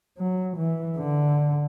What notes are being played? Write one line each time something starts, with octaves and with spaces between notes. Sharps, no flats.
F#3
E3
D3